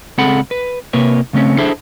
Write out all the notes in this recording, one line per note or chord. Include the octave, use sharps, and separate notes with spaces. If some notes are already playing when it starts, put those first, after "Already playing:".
C#2 C4 G#4 A4 F#5 B5
B4
C3 A#3 B4 C#5
C#3 A3 C4 C#4
D4 E4 G#4 A4 C5 E5